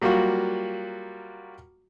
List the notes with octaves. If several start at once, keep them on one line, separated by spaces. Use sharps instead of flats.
F#3 G3 A#3 F4 F#4